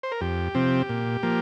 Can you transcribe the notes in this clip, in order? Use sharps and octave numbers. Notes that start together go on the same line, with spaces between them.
C5
A#4
F2 G4
C3 F3 C4
A#2
F3 A#3